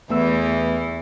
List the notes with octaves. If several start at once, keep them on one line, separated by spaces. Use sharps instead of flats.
E2 E3 A3 B3 E6